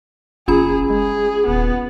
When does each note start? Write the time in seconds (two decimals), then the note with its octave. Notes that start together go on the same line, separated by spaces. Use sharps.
0.48 F#1 C#4 F4 G#4 B5
0.90 G#3 G#4
1.47 D#1 B3